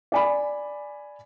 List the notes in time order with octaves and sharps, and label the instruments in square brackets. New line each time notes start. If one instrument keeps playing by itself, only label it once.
[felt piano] D5 G#5 B5